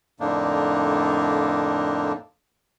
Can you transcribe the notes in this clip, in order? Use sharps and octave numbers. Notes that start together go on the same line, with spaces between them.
F2 A2 D3 A#3 D4 D#4